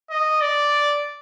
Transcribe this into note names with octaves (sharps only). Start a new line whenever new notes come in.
D#5
D5